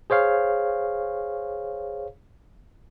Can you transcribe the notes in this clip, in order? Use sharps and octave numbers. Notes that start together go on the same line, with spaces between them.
G#4 C5 C#5 F5